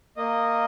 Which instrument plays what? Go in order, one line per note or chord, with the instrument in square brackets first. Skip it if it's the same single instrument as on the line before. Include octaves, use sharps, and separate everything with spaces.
[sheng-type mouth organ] A#3 D#5